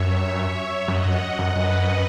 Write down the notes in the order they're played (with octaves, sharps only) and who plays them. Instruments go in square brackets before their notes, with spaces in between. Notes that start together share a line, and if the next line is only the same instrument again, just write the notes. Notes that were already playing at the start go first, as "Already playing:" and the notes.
Already playing: [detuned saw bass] F#2 [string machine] C#5 E5
[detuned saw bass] F#2 [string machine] D#5 F#5
[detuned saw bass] F#2
F#2
[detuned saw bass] F#2 [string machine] B4 D#5